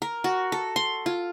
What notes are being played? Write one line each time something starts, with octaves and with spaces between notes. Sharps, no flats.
A#4
F#4
A4
C6
F4